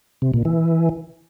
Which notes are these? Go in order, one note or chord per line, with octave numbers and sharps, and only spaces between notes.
C3
A#2
E3